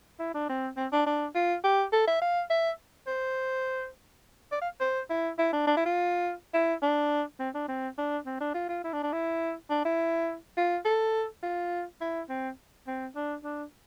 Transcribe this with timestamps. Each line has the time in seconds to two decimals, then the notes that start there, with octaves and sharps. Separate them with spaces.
0.19 E4
0.34 D4
0.49 C4
0.77 C4
0.92 D4
1.06 D4
1.35 F4
1.64 G4
1.92 A4
2.07 E5
2.21 F5
2.50 E5
3.07 C5
4.52 D5
4.61 F5
4.80 C5
5.10 E4
5.38 E4
5.52 D4
5.67 D4
5.77 E4
5.85 F4
6.54 E4
6.82 D4
7.39 C4
7.54 D4
7.68 C4
7.98 D4
8.26 C4
8.40 D4
8.54 F4
8.69 F4
8.84 E4
8.93 D4
9.03 D4
9.12 E4
9.70 D4
9.85 E4
10.57 F4
10.85 A4
11.43 F4
12.01 E4
12.29 C4
12.87 C4
13.15 D4
13.44 D4